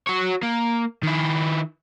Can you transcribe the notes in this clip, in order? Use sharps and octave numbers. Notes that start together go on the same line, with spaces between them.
F#4 C#5
A#3
D#3 E4